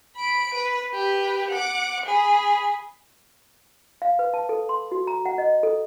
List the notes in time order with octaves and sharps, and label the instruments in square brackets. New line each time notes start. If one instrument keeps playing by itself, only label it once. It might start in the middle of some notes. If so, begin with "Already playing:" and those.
[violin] B5 D7
B4
G4 B4
F#5 D6
G#4 B5
[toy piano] F5
B4
A5
A4
C6
F#4
A#5
F#5
D#5
A4